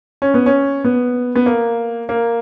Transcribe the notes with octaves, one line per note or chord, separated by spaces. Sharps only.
C#4
B3
C#4
B3
B3
A#3
A#3